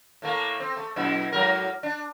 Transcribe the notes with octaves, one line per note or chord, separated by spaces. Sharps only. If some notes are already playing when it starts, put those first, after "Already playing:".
A2 A3 A#3
C4
A3
F#2 B2 E4
G#2 F#3 A#4
D4